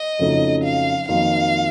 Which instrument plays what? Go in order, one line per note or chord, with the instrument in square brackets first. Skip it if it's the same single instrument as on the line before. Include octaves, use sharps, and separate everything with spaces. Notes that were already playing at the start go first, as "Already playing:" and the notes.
Already playing: [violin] D#5
[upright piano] F2 C#3 F#3 A3 D#4
[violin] F5
[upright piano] F2 D#3 F#3 A#3 F4 [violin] F5